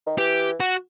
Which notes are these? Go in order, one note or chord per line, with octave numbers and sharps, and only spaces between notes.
D#3
E3 G4
F#4